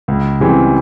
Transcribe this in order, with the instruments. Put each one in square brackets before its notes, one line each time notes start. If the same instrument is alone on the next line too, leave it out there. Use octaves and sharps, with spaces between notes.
[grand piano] C#2
C#3 E3 G3 C4